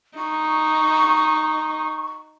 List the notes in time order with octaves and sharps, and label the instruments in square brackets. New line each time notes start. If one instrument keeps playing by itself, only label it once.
[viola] D#4 [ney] C#6